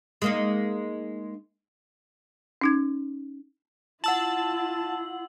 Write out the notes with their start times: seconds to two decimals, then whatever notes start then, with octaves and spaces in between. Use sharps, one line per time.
0.22 G#3 A#3 D#4
2.61 C#4 D#4 G#6
4.04 E4 F4 F#5 A5 E6 F#7